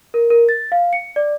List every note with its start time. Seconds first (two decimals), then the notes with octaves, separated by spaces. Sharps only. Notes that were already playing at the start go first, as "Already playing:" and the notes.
0.14 A#4
0.30 A#4
0.49 A6
0.72 F5
0.93 C#7
1.16 D5